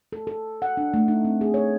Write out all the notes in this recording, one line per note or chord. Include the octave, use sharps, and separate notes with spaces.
A4
A4
F#5
D4
A3
D#4
C4
G#4
C#5